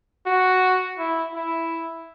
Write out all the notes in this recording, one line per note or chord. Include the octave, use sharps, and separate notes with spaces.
F#4
E4
E4